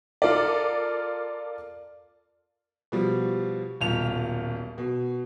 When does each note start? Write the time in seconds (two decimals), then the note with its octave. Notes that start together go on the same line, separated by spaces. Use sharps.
0.22 F4 A4 A#4 D5
2.92 B2 F3 G3
3.81 D#1 B1 F4 F7
4.78 B2